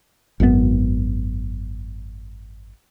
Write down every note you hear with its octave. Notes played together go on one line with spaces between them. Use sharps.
G#1 F#2 C3 B3